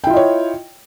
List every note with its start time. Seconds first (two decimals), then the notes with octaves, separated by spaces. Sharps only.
0.04 G5
0.07 E4
0.10 F4
0.13 D#5
0.17 C#5